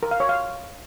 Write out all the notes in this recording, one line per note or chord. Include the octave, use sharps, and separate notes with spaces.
A#4
F5
C#5
F5